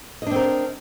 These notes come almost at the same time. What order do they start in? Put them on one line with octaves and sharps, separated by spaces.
D#5 D4 C4 A#4